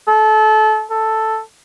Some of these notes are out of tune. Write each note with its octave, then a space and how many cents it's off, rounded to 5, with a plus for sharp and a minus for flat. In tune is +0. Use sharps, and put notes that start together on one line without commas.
A4 -25
A4 +5